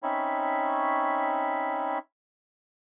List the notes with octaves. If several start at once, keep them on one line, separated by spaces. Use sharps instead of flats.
C4 C#4 D#4 C#5 E5 B5